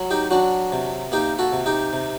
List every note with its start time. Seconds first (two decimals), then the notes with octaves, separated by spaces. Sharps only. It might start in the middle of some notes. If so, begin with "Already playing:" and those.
Already playing: F#3
0.10 D#4 G4
0.31 F#3 D4 F#4
0.72 C3
1.12 A#3 D#4 G4
1.39 F#4 A4
1.53 C3
1.66 D#4 G4
1.93 C3